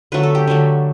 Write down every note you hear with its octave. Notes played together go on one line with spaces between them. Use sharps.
D3 F#3 A3 B4
A4
G4
D3 F#3 A3